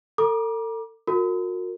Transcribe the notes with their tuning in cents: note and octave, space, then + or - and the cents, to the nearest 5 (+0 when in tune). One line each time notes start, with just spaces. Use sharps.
A4 +40 A#5 +35 D6 +15
F#4 -35 A#4 -30